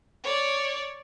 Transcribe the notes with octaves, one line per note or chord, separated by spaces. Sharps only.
C#5 D5